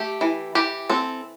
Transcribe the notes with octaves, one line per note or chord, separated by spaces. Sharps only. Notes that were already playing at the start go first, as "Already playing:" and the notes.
Already playing: A3 G4
E3
E3 G4
C4 A4